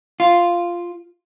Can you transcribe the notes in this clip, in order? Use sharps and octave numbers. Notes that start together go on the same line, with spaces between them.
F4